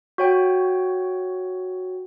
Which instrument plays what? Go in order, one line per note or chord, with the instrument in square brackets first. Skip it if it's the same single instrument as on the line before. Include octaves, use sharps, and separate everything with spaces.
[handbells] F#4 C#5 G5